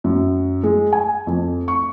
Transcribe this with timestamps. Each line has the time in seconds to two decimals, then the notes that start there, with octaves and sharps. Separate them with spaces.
0.04 F#2
0.64 G#3
0.93 G#5
1.27 F2
1.68 C#6